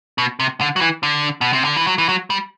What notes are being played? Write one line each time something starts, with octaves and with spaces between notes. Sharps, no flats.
B2
C3
D3
F#3
E3
D3
B2
C3
D3
E3
F#3
E3
F#3
G3